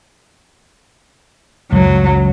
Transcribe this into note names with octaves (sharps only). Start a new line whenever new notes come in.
C#2 F#2 F#3